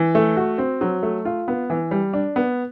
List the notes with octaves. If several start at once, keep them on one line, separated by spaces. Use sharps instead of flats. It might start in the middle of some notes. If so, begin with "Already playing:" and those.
Already playing: E3
A3
F#4
C4
F#3
A3
F4
B3
E3
G3
D4
B3